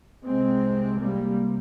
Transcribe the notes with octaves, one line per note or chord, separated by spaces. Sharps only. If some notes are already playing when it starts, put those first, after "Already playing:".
C2 C3 G#3 C4
G3 A#3